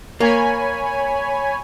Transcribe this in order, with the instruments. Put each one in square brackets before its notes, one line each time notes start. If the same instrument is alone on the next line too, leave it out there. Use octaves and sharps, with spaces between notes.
[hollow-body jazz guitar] A#3 [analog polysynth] C#5 G#5 B5